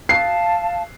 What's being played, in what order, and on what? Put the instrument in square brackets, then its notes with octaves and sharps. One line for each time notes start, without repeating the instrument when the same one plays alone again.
[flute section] F5 A5 [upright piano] C7